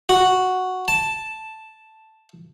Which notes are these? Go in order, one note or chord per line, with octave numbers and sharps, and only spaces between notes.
F#4
A5